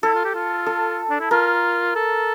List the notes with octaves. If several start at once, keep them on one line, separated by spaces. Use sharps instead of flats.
E4 A4
F4
G4
F4
A4
D4
E4
F4 A#4
A4